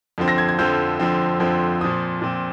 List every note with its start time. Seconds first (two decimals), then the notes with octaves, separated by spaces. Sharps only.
0.18 F2 D3 F3 C4
0.28 A#6
0.38 G#6
0.49 G#6
0.59 F2 D3 F3 C4 G6
0.99 F2 D3 F3 C4
1.40 F2 D3 F3 C4
1.81 A#2 F3 C4 D#6
2.22 A#2 F3 C4